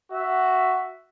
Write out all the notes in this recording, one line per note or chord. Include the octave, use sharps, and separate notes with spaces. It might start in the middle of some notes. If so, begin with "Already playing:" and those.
F#4 E5 F#5